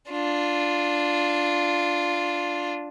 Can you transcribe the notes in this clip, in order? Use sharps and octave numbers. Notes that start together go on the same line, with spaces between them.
D4 F4